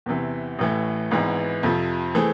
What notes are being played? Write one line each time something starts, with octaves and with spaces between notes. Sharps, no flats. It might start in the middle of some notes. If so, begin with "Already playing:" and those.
E2 C3 E3
A1 A2 E3 A3
G#1 G#2 E3 B3
F2 C3 F3
E3 A3 C4 G#4